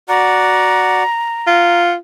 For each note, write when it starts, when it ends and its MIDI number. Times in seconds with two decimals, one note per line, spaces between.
0.09 1.03 66
0.09 1.03 74
0.09 1.03 78
0.09 1.81 82
1.47 1.95 65
1.47 1.93 78